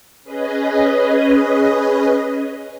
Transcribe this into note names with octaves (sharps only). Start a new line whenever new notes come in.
C#4 G#4 B4 D#5